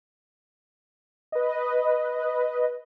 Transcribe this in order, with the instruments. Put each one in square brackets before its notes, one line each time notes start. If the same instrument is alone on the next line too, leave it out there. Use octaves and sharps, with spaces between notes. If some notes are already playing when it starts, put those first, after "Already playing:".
[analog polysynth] B4 D#5